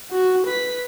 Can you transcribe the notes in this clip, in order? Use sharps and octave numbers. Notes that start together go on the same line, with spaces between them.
F#4
B4 B6